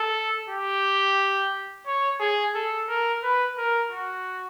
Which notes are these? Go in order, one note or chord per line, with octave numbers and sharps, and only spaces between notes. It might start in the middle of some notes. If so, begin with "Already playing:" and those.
Already playing: A4
G4
C#5
G#4
A4
A#4
B4
A#4
F#4